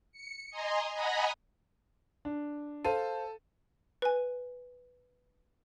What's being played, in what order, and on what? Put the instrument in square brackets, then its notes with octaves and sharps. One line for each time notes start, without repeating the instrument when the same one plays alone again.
[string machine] C#7
D#5 G#5 A#5 C6
D#5 F#5 G#5 A#5 B5 D#6
[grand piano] D4
[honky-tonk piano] A4 [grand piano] C5 F5 D#7
[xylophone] B4 G#5